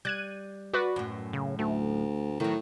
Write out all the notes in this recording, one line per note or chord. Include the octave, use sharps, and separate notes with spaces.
G3 F#6 G#6 D#7
F#4 B4 D5
F#2 A2
C#3
D2 A3
A2 D#3 F#3